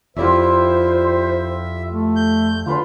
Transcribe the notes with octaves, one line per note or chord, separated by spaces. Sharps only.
F2 E4 F4 G4 C5 D5 E5
A3
G6
D3 F4 B4 C6